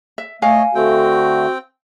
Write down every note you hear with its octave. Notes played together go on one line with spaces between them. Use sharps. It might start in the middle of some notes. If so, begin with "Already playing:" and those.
E5
A3 C#5 D#5 F5 G#5
D3 A3 C4 F#4 G5